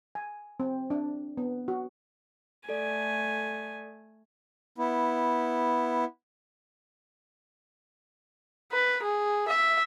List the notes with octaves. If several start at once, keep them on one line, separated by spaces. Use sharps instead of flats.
G#5
C4
D4
B3
F#4
A3 A4 D5 G#5
B3 E4
B4
G#4
E5